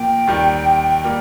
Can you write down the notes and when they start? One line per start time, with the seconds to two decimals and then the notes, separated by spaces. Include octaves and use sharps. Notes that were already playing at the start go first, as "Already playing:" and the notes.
Already playing: A#2 F3 A#3 G5
0.27 D#2 D#3 G3
1.04 G3 A#3